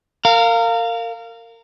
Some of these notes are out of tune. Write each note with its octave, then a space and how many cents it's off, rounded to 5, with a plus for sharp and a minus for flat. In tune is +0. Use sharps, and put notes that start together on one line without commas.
A#4 -30 F5 +0